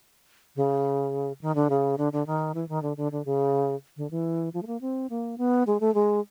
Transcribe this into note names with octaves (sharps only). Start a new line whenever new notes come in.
C#3
D#3
D3
C#3
D3
D3
D#3
E3
D#3
D3
D3
D3
C#3
D3
E3
F3
A3
A#3
C4
A#3
B3
G#3
A3
G#3